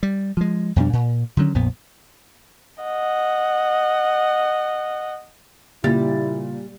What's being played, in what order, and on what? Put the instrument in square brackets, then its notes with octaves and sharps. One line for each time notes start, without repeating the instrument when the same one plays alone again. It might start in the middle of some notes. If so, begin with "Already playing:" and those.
[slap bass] G3
F3 G#3
F2 B2 G3 D4
A#2
D3 D#3 F#3 C#4
A#1 F2 A#2 B3
[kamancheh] D#5 F#5
[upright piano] A#2 A6 [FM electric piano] C#3 [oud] G3 [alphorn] E4